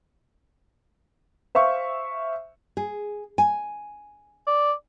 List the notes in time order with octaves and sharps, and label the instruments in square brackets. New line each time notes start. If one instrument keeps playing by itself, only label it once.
[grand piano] C5 E5 F5 C#6
[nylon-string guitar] G#4
G#5
[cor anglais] D5